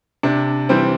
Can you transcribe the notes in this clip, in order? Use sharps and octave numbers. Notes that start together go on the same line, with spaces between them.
C3 D4
E3 G3 C4